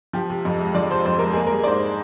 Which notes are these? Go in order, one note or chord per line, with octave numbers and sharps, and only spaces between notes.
F3 G4
C3
F2
G#3
F3 D5
C3 C5
F2 C5
G#3 A#4
A#3 G#4
G3 A#4
D5
G#2 C5